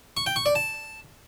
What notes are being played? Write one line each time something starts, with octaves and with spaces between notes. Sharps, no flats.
C#6
G5
C#6
D5
A5